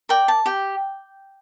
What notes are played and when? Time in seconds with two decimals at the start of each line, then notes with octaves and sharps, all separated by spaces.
0.09 A#4 D5 G5
0.28 A5
0.46 G4 G5